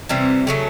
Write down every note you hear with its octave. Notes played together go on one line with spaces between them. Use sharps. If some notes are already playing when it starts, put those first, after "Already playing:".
C3 E3 G3 C4
C#3 F#3 A3